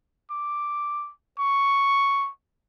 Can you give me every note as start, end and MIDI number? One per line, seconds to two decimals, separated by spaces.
0.31 1.12 86
1.39 2.30 85